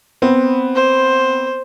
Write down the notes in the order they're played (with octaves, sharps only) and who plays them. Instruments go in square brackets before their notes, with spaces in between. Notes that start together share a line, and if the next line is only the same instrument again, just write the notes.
[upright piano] B3 C4
[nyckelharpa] C5